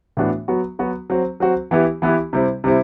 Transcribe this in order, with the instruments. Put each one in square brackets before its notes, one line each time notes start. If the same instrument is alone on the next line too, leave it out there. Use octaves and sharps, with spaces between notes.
[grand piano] A2 E3 B3 D4 F#4
F#3 B3 F#4
F#3 B3 F#4
F#3 C4 F#4
F#3 C4 F#4
E3 B3 E4 G4
E3 B3 E4 G4
C3 G3 C4 E4
C3 G3 C4 E4